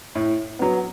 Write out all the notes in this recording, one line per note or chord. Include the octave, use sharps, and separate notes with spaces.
A2
F#3 B3